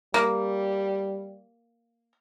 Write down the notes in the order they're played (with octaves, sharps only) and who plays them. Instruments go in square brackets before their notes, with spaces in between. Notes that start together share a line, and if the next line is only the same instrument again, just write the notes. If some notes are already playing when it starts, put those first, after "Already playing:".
[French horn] G3 [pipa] A#3